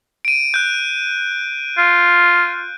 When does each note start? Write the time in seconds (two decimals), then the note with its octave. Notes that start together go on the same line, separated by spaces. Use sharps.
0.25 D7 D#7
0.54 F#6 G6
1.78 F4